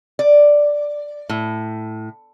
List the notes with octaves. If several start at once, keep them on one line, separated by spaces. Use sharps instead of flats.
D5
A2